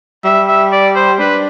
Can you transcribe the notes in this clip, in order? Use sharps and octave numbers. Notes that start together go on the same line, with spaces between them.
G3 E5
E5
D5
C5
D4 B4